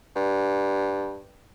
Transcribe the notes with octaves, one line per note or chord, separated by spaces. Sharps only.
G2